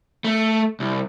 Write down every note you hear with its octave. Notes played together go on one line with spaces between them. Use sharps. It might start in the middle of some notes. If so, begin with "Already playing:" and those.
A3
C2